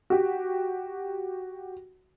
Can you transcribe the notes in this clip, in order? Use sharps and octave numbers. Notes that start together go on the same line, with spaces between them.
F#4 G4